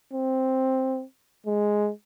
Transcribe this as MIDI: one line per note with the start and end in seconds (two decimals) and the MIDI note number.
0.13 1.03 60
1.47 1.90 56